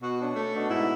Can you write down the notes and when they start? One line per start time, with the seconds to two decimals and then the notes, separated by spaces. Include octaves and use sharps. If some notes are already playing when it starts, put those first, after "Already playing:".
0.02 B2 F#4
0.19 C#4 D4
0.36 A3
0.54 B2 D4
0.70 G#2 E4